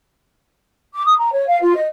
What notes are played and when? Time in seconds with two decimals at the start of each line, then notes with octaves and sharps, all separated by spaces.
0.94 D6
1.06 D#6
1.19 A#5
1.33 C#5
1.47 F5
1.61 F4
1.75 D#5